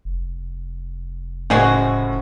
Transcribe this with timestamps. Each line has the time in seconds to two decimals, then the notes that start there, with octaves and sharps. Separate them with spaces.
0.05 F1
1.50 A2 C#3 F3 G#3 F#4